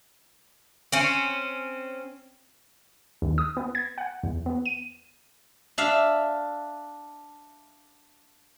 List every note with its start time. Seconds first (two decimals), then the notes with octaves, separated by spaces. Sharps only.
0.92 C4 C#4
3.22 D#2
3.38 D#6
3.57 B3
3.75 G#6
3.98 F#5
4.23 E2
4.46 B3
4.65 D#7
5.78 D4 E5 F5